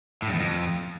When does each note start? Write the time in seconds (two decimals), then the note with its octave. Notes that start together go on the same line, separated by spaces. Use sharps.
0.22 A2
0.28 G2
0.34 E2
0.40 F2